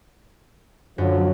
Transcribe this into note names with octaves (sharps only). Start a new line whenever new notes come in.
F#2 D3 F3 F#3